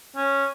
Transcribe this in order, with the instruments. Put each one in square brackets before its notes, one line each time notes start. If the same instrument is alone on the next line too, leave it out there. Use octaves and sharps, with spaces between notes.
[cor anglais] C#4